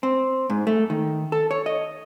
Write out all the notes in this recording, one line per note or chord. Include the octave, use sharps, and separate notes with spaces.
C4
G#2
A3
D#3
A4
C#5
D#5